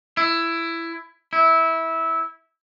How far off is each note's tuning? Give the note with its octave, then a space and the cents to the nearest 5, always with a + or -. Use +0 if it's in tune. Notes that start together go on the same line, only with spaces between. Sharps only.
E4 +15
E4 -15